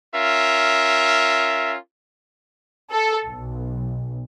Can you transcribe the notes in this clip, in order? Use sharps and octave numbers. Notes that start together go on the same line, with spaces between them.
C#4 F4 A#4 E5
A4
B1